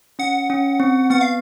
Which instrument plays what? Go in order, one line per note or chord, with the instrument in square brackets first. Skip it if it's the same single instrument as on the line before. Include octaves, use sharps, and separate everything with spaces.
[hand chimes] C#4 [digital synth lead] F#5
[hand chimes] C#4
C4
[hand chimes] B3 [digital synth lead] F#5
[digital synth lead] F5